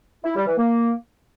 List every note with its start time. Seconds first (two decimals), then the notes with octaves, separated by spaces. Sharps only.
0.24 E4
0.35 G3
0.46 E3
0.58 A#3